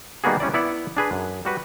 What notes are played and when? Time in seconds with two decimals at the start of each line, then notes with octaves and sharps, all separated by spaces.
0.24 D#3 G3 A#3 B3 F#4 G#4
0.40 G3 C#4 E4 D5
0.54 B3 E4 D5 F#5
0.97 D4 G#4 B4
1.12 F#2
1.45 G3 F#4 B4